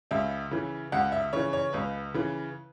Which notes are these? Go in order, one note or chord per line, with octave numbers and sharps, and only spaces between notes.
C#2 E5
C#3 E3
C#2 F#5
E5
C#3 E3 C#5
C#5
C#2 B4
C#3 E3